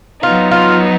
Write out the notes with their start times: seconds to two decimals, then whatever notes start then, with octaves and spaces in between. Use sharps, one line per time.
0.23 F#3 B3 D#4 F4
0.51 F4